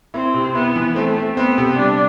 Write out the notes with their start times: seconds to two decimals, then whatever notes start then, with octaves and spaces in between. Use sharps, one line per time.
0.14 C4 E4
0.34 C3
0.55 B3 E4
0.76 E3
0.96 A3 C4
1.16 C4
1.37 B3 C4
1.58 C3
1.78 G3 D4